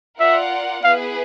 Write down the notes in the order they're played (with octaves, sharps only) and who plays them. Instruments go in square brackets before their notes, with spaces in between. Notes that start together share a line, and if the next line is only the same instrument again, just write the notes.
[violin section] F4 A#4 D5 F#5 [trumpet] E5
[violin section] B3 E4 G#4 B4 [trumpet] F5